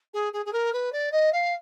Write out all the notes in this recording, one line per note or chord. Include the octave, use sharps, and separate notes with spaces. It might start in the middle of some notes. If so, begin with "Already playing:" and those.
G#4
G#4
G#4
A#4
B4
D5
D#5
F5